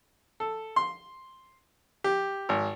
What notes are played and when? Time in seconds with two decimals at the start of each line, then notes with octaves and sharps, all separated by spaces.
0.40 A4
0.76 C6
2.04 G4
2.49 G#1